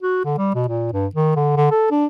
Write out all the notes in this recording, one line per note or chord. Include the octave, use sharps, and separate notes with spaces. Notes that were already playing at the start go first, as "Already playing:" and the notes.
F#4
D3
G3
B2
A#2
G2
D#3
D3
D3
A4
D4